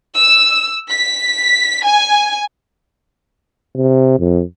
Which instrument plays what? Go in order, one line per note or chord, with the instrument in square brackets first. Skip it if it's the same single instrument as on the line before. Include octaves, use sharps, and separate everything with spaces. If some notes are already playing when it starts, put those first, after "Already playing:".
[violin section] E6
B6
G#5
[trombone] C3
F2